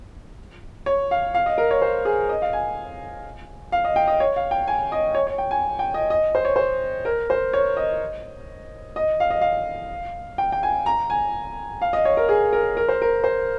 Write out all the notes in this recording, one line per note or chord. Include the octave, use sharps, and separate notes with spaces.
C#5
F5
F5
D#5
A#4
C#5
C5
G#4
D#5
F5
G#5
F5
D#5
G5
D#5
C#5
F5
G5
G#5
D#5
C#5
C#5
G5
G#5
G5
D#5
D#5
C5
C#5
C5
A#4
C5
C#5
D#5
D#5
F5
D#5
F5
G5
G5
G#5
A#5
G#5
F5
D#5
C#5
A#4
G#4
A#4
A#4
C5
A#4
C5